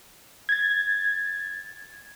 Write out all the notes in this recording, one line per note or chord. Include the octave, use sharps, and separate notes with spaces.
G#6 A6